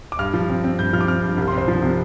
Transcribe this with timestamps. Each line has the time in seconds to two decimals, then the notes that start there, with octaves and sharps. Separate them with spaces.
0.12 D6
0.19 G2 F6
0.34 F3
0.50 C4
0.64 C4
0.79 G2 G6
0.93 F3 F6
1.01 D6
1.08 C4 F6
1.23 G2
1.37 C2
1.48 C6
1.53 C4 C5
1.68 F3
1.82 C3